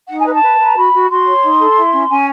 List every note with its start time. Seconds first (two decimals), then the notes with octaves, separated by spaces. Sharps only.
0.09 D#4 F#5
0.18 G#5
0.25 B4
0.34 A5
0.43 B4
0.59 B4
0.65 A#5
0.76 F#4 B5
0.93 F#4
1.09 F#4 C6
1.26 C#5
1.43 D#4
1.59 A4
1.76 E4
1.92 C#4
2.09 C#4 G#5